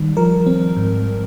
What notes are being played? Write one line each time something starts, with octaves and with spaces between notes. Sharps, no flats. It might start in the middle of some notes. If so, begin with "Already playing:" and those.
Already playing: D#3 G3
F3 A#4
C4
G#2